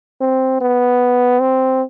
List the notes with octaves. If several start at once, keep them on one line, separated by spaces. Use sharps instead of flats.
C4
B3
C4